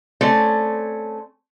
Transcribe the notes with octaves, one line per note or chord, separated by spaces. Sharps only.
A3 C4 C#4 D5